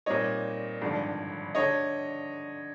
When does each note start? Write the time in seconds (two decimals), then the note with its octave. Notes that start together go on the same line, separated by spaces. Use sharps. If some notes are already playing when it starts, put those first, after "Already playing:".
0.06 A#2 G3 C4 D#4 C#5 D#5
0.82 G#1 G2 D3 F3
1.55 D3 C#5 D#5